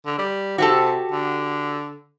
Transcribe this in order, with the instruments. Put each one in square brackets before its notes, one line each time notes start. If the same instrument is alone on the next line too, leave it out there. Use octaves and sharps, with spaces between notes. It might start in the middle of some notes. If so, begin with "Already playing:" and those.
[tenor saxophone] D3
G3
[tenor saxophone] C3 [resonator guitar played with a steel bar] F#4 G4 A4
[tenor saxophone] D3